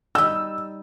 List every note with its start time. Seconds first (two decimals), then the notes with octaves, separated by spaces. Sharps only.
0.15 G3 D#4 E6